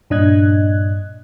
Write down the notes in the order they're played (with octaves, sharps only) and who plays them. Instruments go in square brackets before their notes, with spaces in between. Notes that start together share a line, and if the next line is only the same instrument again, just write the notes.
[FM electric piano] G2 A#2 D4 D#5 F#6 G#6